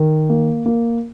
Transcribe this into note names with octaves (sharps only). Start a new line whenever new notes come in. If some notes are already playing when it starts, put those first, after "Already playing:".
Already playing: D#3
A#3
A#3